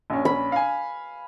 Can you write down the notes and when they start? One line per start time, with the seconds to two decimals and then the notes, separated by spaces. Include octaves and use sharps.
0.10 A#1 C#4
0.25 B5
0.52 F5 G#5